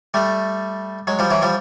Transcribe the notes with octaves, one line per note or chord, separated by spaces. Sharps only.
G3 A3
F#3 G#3
F3 G3
E3 F#3
F3 G3